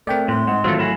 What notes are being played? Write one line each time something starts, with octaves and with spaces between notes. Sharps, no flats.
A3 C4 A#4 D5 G5
A2 C6
G#2 F#5
G#2 D#3 E3 F#3 A3 C4 F4 A4
E4 F#4 G#4